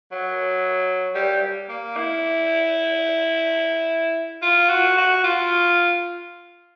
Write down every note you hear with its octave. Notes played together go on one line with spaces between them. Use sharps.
F#3
G3
A#3
E4
F4
F#4
F#4
F4